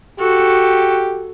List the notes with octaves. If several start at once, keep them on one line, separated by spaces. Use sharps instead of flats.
F#4 G4 A4